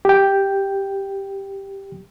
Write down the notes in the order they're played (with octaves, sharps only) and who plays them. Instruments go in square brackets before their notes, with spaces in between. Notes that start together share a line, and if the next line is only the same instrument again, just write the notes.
[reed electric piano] G4 G5